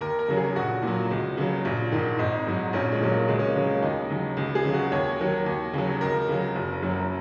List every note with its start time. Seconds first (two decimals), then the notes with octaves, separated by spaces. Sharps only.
0.01 D#2 A#4
0.19 A#4
0.28 C#3 F#3
0.37 G#4
0.56 A#1 F#4
0.82 A#2 F#3
1.11 C#2
1.37 C#3 F#3
1.65 A#1
1.92 G#2 D#3
2.18 G#1 D#4
2.47 G#2 F#3
2.73 A#1 C#4
2.92 G#3
3.00 A#2 F#3
3.10 A#3
3.28 C#2 G#3
3.39 C#4
3.46 A#3
3.56 C#3 F#3
3.64 A#3
3.82 D#2 D#4
4.10 C#3 F#3
4.37 C#2
4.55 G#4
4.64 C#3 F#3
4.73 F#4
4.92 D#2 C#5
5.19 D#3 F#3
5.46 D#2
5.73 C#3 F#3
6.01 C#2 A#4
6.28 C#3 F#3
6.56 F#1
6.82 F#2 F#3